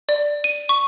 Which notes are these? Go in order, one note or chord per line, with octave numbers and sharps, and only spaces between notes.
D5
D#7
C#6